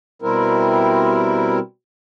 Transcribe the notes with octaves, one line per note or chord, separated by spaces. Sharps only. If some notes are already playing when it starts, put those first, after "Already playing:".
B2 G3 C4 E4 A#4